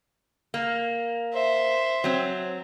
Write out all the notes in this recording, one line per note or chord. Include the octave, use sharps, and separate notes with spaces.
A#3
C5 E5
F#3 C4